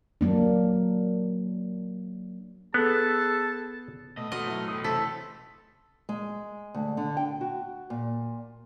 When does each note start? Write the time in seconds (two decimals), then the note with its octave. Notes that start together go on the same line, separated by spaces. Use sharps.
0.21 F#3 A#3 D4
2.74 B3 G#4 A4 A5
4.17 B2 A3 D#5
4.32 B2 A3 F#4 D#5 C6 F6
4.47 F#3 E4
4.68 E3 A3 D#6
4.84 C3 E4 A4 C5 B6
6.09 G#3
6.74 D2
6.97 D3
7.17 G5
7.41 F#4
7.90 A#2